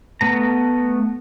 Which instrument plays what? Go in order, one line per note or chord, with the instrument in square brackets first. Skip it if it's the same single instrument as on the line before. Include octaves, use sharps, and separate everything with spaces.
[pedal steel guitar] A3 B3 A#5